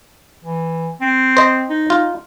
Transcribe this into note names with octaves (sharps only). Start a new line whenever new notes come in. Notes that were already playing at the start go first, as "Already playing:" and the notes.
E3
C4
C5 D#5
D#4
F4